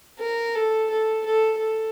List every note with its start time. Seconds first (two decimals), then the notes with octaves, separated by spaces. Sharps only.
0.19 A#4
0.55 A4
0.90 A4
1.26 A4
1.60 A4